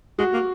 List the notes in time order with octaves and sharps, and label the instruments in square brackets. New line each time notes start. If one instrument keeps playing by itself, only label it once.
[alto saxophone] G#3 [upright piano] F#4
[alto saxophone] A#3